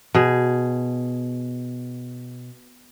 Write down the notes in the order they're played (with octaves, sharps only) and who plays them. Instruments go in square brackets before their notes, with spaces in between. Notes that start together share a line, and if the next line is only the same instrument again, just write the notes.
[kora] B2 G#4